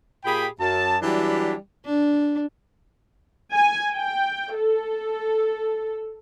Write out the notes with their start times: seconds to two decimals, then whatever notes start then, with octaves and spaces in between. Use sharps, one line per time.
0.24 A#2 G4 G#4 G5 B5
0.60 F#2 A5
1.02 E3 F#3 G3 D4 E4 G4
1.86 D4
3.55 G#5
3.91 G5
4.55 A4